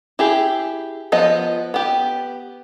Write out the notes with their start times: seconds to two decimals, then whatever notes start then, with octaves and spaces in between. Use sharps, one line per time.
0.19 E4 G4 G#4
1.12 F3 B3 D#5
1.74 B3 G4